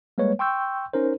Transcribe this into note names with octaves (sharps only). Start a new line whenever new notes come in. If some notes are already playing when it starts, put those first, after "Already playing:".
G3 G#3 A#3 B4 C#5
G5 C6 C#6 E6 G6
C#4 D#4 A#4 C5